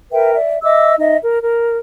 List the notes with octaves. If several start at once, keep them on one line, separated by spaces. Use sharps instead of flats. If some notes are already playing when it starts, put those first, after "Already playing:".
A#4 B4 E5 G5
D5 E5
D#5 E5 D6 E6
D#4 D#5 E5
A#4
A#4